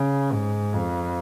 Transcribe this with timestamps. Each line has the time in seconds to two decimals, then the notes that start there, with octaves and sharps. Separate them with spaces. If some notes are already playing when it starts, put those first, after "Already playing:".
Already playing: C#3
0.32 G#2
0.73 F2